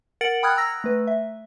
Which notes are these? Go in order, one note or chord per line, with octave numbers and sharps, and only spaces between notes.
A#4 F#5 A6 C#7 D7 F#7
G5 B5 D#6 F6 F#6 G#6
A#5 E6 A#6
A3 B4
E5